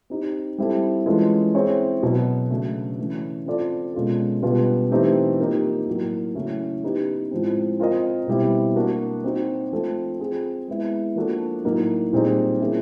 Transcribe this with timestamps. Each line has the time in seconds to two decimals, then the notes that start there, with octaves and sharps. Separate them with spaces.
0.10 C4 D#4 G4
0.58 G3 C4 E4 A4
1.06 E3 G#3 C#4 F4 A4
1.55 C4 E4 G#4 C#5
2.02 B2 F#3 B3
2.51 C#3 F#3 A3 D4
2.99 E3 A3 C#4
3.46 C4 F4 A4 D5
3.94 B2 G#3 C#4 F4 A4
4.42 B2 G3 B3 D4 F4
4.91 E3 A3 C4 D#4 G4
5.40 F3 A#3 D#4 G4
5.87 A2 F#3 A#3
6.35 C#3 F#3 A3 C#4 E4
6.84 B3 D#4 G4 B4
7.31 A2 F3 G#3 C4
7.79 C4 F4 A#4 D#5
8.27 B2 G3 C4 E4
8.76 A#3 D4 F#4
9.24 C4 D#4 F#4
9.73 F3 A3 C4 F4 A4
10.20 C4 F4 G#4
10.68 G#3 B3 E4
11.16 F3 A#3 D4 F#4 A4
11.65 A2 F#3 A#3 D#4
12.13 A#2 G3 C4 D#4 G#4
12.60 F3 A#3 C#4 E4 G#4